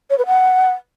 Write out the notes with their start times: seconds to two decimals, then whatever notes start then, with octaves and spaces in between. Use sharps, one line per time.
0.10 C#5
0.18 B4
0.26 F#5